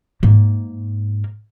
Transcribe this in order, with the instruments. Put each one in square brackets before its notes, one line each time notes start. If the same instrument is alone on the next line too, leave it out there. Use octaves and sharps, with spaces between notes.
[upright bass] G#2 A#3